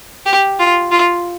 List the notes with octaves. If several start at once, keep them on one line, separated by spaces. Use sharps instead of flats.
G4
F4
F4